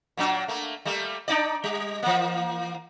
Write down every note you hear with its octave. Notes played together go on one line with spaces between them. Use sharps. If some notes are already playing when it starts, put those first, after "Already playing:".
A#2 F#3 D4
A3 A#3
G3 A3 A#3
D4 D#4 D5
G3
E3 A#3